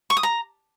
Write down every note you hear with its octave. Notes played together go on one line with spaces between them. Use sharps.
C#6
D#6
A#5